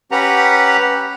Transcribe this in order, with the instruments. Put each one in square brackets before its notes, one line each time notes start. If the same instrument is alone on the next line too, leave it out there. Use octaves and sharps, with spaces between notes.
[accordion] C#4 G4 B4 F#5 A#5